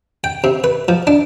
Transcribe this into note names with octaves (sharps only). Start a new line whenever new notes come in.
G5
C3
B4
F3
D4